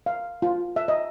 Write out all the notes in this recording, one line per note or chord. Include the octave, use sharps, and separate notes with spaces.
F5
F4
E5
D#5